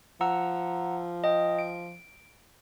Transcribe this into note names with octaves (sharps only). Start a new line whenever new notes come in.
F3 F#5 A#5 E6
D#5 G5
D7